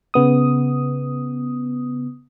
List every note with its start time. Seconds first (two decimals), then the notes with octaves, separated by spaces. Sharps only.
0.14 C#3 B3 D#6